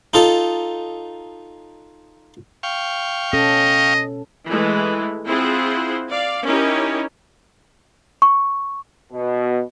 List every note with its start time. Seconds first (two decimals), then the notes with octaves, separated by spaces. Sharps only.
0.14 D#4 F4 A4
2.63 F5 G5 C#6
3.33 B2 C#4 A4 D#5
4.46 E3 G#3 A3
5.26 C4 E4 F4 G#4 C5 F#5
6.10 D5 F5
6.44 C#4 D#4 E4 G4 A#4 C#5
8.22 C#6
9.13 B2